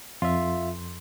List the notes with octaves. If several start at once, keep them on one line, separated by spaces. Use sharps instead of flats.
F2 F4 E5 C6